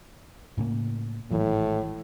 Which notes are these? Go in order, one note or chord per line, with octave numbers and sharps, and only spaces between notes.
A2 C#3 A#3
G#1 A2 E3 F#3